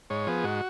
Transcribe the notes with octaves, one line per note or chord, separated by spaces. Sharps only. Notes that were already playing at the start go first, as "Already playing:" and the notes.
G#2 C#5
F3 B3 G#4
G#2 F#4